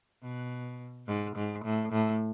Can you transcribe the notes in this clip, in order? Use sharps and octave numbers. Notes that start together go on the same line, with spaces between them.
B2
G#2
G#2
A2
A2